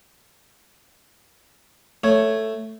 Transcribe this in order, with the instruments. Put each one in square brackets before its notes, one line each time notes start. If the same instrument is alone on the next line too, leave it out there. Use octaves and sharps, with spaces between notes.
[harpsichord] A3 [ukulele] C#5